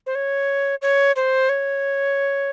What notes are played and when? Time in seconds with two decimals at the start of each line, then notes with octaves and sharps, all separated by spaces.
0.06 C5
0.15 C#5
0.82 C#5
1.16 C5
1.49 C#5